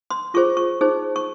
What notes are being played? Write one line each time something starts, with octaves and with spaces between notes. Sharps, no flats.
C6
F4 G#4 C5 C#6
C#6
D#4 G#4 C5
C#6